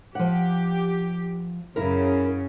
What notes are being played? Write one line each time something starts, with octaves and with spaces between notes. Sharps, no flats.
F3 G4 F#5
F#2 C#3 E4 A#4